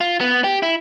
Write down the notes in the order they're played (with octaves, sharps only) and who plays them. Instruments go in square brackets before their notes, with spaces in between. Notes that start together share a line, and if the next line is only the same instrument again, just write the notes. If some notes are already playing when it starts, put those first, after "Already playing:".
[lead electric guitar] F4
B3
G4
E4